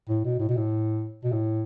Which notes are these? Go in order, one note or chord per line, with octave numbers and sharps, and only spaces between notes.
A2
B2
A2
B2
A2
B2
A2